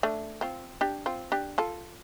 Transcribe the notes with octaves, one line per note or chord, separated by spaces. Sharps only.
A3 D4
C4 F4
D4 G4
C4 F4
D4 G4
F4 A4